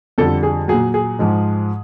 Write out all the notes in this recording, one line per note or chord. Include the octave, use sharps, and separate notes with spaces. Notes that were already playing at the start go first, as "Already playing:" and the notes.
F2 D3 G3 A4
G#4
A#2 F#3 G#4
G#4
G#2 F3 G#3